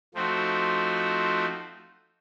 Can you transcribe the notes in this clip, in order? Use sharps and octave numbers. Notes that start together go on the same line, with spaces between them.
F3 A3 C4 D#4 F#4